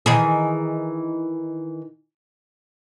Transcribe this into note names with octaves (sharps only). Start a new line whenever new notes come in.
D#3 E3 G#4